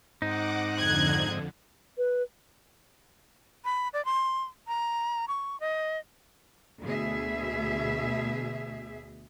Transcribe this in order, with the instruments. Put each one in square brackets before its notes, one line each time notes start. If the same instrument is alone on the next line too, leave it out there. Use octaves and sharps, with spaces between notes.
[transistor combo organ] G#2 C4 D#5 [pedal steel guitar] D#4 [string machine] F#5 D6
[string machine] F2 D3 [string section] F#6 G#6
[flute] B4
[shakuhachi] B5
D5
C6
A#5
C#6
D#5
[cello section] D2 B2 G#4 E5